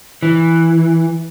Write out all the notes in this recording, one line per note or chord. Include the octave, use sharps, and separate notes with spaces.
E3